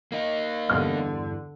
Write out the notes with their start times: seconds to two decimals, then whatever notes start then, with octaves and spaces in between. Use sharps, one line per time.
0.12 A#3 D#4
0.70 E2 G2 D3 F6